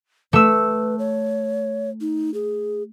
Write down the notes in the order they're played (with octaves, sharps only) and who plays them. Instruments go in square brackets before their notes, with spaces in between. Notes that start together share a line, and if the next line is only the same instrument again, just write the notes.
[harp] A3 E6 [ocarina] B4
[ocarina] C#5
D#4
G#4